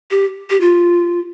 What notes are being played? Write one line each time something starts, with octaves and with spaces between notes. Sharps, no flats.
G4
G4
F4